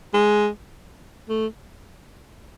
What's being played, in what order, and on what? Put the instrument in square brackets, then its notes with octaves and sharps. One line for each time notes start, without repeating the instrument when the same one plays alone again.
[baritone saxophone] G#3
A3